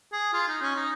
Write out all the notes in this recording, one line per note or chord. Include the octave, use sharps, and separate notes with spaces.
G#4
F4
D#4
C#4
D#4